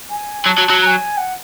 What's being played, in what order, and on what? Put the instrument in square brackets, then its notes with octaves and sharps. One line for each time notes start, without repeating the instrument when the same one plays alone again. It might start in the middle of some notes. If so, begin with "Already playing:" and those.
[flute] G#5
[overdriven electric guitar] F#3 [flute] A5
[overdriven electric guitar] F#3
F#3
[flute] A#5
G#5
F#5